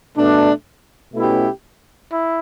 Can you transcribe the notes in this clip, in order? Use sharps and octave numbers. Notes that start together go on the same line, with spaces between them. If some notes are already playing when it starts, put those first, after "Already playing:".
B2 A3 D4
B2 A3 C#4 E4 G4
E4